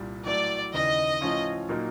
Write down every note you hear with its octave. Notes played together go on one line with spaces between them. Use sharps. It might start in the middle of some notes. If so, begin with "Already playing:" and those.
Already playing: C2 A#2 G3
A2 F#3 A3 D5
D#2 C#3 E3 D#5
A2 F3 A3 C#4 F4
A#2 F#3 A#3 D#4